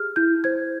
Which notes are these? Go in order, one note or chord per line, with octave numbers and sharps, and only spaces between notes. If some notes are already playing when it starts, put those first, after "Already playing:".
Already playing: G4 G#4 F6
E4 G6
C5 G#6